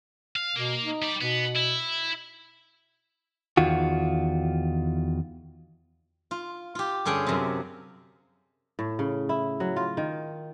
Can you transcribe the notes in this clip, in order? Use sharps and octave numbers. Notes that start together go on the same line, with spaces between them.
F5
B2 A#3
D#4
G3 D5
B2 B3
E4
E2 D#3 F4 F#4
F4
F4 G4
G2 D3 C#4 G#4 G5
F#2 C3
A2
C#3
E4
F#3
F4
D#3